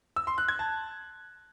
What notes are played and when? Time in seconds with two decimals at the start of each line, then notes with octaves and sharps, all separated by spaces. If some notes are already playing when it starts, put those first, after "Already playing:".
0.16 E6
0.27 C6
0.38 F#6
0.48 G#6
0.59 A5